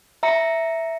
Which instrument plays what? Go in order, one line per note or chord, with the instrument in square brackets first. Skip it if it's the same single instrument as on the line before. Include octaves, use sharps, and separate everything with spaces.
[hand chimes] E5 A#5 C#7